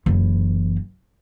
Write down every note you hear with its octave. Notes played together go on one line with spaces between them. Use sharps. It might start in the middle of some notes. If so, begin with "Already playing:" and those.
F#1 E3